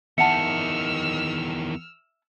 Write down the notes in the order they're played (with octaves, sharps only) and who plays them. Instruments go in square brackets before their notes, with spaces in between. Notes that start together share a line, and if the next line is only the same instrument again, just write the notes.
[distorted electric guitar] E2 D#3 [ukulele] E5 F#5 A5 [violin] E6 F6 [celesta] C#7